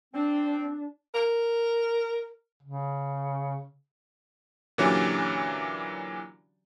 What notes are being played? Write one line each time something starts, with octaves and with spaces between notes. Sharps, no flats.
C4 D4
A#4
C#3
A#2 D3 E3 F#3 C#4 G4